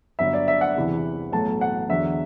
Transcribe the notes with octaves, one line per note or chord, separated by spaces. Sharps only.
G1 G2 F#3 E5
D5
E5
F#5
E2 C3 E3
B1 A2 F#3 A5
F#5
E2 D3 F#3 E5